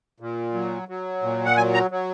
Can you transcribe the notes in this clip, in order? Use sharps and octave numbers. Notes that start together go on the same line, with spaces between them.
A#2
F#3
F#3
A#2
F#5
F#3 G#5
A#5
F#3